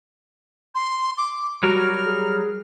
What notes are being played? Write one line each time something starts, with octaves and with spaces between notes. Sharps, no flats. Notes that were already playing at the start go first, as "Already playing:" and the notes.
C6
D6
F#3 G3 F#4 A#4 F6
G#4